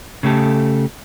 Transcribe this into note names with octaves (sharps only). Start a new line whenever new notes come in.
C#3 A3 G4 A4